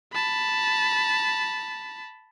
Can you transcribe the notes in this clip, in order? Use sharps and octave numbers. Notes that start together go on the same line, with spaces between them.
A5 B5